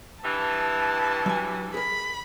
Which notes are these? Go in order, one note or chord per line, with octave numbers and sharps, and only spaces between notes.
G2 E3 A5
F#3 G#5
G#4 A#4 B5